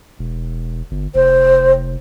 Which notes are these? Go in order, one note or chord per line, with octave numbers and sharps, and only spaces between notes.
E1
G1
F1 C5